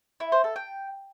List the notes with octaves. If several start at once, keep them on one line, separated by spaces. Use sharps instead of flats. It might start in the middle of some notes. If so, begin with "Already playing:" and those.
E4
C5
A4
G5